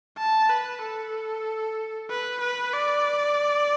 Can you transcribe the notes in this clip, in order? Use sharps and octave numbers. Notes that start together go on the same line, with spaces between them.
A5
B4
A4
B4
B4
D5